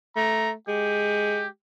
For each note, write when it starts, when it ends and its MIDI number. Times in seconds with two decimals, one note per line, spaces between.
0.16 0.53 57
0.16 0.51 82
0.68 1.47 56
0.68 1.47 67